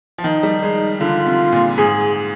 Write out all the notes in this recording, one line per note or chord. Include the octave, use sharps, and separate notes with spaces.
F3
D#3 D#4
G3
G#3
D3 F4
C3
A#2
G#2 G#4